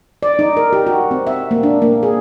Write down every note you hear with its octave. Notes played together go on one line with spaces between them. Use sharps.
D5
D#4
A#4
G4
F#4
C4
E5
A#3
D4
A#3
G#4